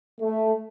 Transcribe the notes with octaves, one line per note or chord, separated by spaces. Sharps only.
A3